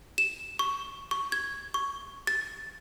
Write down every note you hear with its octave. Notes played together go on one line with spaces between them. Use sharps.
E7
C#6
C#6
G#6
C#6
A6